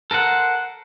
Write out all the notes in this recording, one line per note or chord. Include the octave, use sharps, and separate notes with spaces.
A4 A#4 C5 F#5